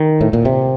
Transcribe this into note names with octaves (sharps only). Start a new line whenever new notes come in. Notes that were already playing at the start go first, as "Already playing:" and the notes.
Already playing: D#3
A2
A#2
C3